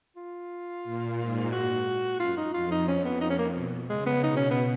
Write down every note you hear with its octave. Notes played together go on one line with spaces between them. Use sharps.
F4
A#2
G#2
F#4
F#2 F4
D#4
F2 F4
D#4
F2 C#4
B3
D#4
C#4
A#3
B2
C#3 G#3
B3
B2 D#4
C#4
B3